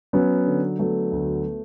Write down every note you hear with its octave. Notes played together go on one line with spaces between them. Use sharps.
F#3 B3 C#4
D3
F#3 A3 B3
D2